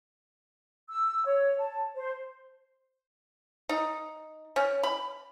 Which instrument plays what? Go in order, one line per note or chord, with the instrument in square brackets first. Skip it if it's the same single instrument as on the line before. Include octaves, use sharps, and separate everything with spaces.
[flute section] E6
C#5
A5
C5
[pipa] D#4
C#4
B5